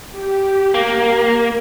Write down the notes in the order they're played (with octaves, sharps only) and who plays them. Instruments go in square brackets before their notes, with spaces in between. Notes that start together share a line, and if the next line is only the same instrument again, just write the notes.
[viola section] G4
[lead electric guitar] A#3